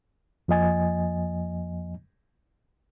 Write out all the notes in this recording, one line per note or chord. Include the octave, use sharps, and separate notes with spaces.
F2 F3 A#3 D#5 G#5 A6